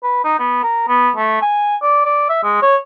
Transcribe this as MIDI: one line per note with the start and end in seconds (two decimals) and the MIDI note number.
0.03 0.20 71
0.24 0.38 63
0.39 0.62 59
0.63 0.87 70
0.88 1.10 59
1.16 1.40 57
1.42 1.76 80
1.82 2.01 74
2.05 2.26 74
2.29 2.41 76
2.43 2.59 56
2.62 2.76 73